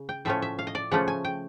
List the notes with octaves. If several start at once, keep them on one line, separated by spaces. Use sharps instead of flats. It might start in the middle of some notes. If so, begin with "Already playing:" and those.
Already playing: C#3
G5
A2 F3 A3 C#4 E5
E5
F5
D#5
D5
C#3 F3 A3 C#4 F#5
G#5
G5